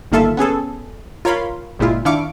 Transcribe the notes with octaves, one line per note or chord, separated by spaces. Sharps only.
G1 D#3 A#3 F4 A4 E5
B3 C#4 G#4 A4
F4 A#4 C#5 F5 B5 C6
G1 A#2 G#3 E4 F4
D#3 D4 E4 F5 C#6 D6